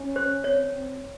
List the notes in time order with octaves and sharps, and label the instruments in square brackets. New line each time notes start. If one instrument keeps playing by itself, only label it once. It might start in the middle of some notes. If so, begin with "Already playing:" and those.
Already playing: [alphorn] C#4
[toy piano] C5
[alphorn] C4 [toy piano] C#5
[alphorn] C4